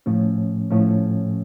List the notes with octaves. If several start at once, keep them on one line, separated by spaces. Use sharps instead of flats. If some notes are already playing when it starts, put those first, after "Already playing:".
A2 F3 A3 C#4
A2 F3 A3 C#4